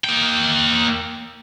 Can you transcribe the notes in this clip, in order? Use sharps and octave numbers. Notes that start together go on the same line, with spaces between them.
A#3 G5